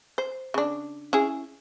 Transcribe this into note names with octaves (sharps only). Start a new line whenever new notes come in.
C5
C#3 D4
C#4 E4 G#4